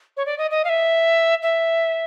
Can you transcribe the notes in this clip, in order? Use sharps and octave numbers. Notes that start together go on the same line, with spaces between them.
C#5
D5
D#5
D#5
F5
E5
E5